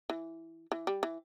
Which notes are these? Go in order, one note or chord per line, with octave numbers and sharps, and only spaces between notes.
E3
E3
G3
E3